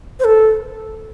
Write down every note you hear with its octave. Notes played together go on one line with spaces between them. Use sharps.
C5
A4